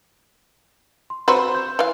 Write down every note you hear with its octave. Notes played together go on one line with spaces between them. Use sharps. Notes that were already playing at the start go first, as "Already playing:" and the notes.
C6
C4 F#4 B4 C5 A#5 B5 E6
C6 G6
E3 F5